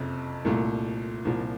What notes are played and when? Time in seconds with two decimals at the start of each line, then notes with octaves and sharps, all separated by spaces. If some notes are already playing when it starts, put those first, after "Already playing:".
Already playing: F#1 F2 C3
0.45 C2 A#2 A3
1.25 C2 A#2 F3